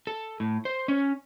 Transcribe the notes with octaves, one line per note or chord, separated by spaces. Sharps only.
A4
A2
C5
C#4